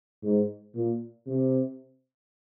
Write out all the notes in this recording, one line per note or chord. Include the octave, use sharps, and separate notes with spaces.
G#2
A#2
C3